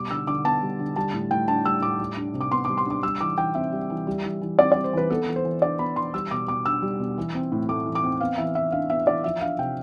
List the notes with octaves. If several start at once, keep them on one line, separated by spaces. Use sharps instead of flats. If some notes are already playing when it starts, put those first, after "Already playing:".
Already playing: B2 G3 D6
D3 E6
D3 D6
B3 A5
G3
D3
G3 A5
A2
A2 G5
D4 A5
G3 E6
A2 D6
G3
D4
C3
D6
B3 C6
D6
G3
C6
D4 D6
G3 E6
E3 D6
E3 G5
C4 E5
G3
E3
G3
E3
E3
C4 D5
D5
G3
C5
E3 B4
B3 A4
E3
C5
E3
D4 D5
B3 B5
E3 C6
G3 E6
B2 D6
B2 D6
D4 E6
G3
B2
E3
C4
A2
A3 D6
E3
D6
C4
B3 F5
E3 E5
E3 E5
D4 F5
B3 E5
E3 D5
F3 E5
D4 F5
C3 G5